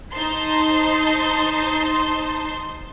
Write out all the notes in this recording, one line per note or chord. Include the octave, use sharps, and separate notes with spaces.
D#4 C5 A5 C6